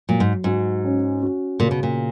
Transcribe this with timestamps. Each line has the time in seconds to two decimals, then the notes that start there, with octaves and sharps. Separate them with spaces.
0.09 A#2 F#3
0.20 G#2
0.44 G#2 F#4
0.84 C#4
1.22 F#4
1.60 A#2 C#3
1.71 B2
1.83 A#2